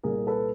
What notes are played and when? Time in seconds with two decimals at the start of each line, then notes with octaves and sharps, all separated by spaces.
0.03 C2 A#2 G#4 A#4
0.27 A4 B4